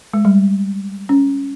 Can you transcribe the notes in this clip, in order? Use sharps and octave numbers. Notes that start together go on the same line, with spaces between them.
G#3
G3
C#4